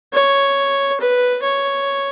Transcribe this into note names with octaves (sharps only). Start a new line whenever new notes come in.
C#5
B4
C#5